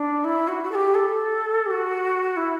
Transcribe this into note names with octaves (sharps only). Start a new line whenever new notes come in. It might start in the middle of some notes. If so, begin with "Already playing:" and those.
Already playing: D4
E4
F#4
F#4
A4
G4
A4
G4
F#4
E4